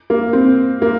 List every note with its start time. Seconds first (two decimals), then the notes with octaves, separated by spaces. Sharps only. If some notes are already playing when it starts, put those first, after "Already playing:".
0.10 A#3
0.33 C4
0.82 A#3